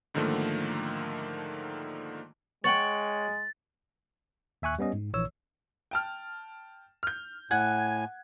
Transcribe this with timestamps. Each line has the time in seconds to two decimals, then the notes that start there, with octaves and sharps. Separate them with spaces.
0.14 G#2 D3 D#3 F3 A3 A#3
2.64 G#3 C#5 F#5 G5 A6
4.62 D#2 E5 G#5 C#6 F#6
4.79 G3 B3 C#4 D#5
4.93 G#2
5.13 A#1 E3 C#5 E6
5.91 G5 A5 F6
7.03 F6 G6
7.51 A2 F#5 G#5 G#6